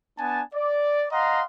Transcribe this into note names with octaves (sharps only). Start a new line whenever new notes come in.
B3 D4 G#5 A5
D5
D#5 F5 F#5 A#5 C6